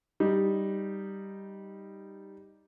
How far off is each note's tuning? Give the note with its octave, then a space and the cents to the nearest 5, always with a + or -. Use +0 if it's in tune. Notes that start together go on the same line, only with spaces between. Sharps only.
G3 +0 D#4 +0